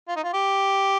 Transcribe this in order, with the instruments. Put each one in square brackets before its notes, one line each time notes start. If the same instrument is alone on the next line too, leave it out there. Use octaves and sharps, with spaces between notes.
[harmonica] F4
D#4
F4
G4